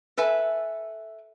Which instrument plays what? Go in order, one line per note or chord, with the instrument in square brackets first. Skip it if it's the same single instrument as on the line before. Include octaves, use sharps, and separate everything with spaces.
[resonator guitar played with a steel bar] A4 B4 E5 G#5